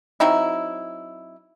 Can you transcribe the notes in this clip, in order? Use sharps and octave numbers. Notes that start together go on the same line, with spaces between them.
F#3 C4 D#4 E4